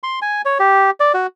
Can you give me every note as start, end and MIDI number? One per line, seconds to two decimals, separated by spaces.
0.03 0.19 84
0.22 0.42 80
0.45 0.58 73
0.59 0.90 67
1.00 1.12 74
1.14 1.27 66